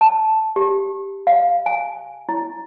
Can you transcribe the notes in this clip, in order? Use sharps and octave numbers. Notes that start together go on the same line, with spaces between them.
A5
G4
F5
G#5
E4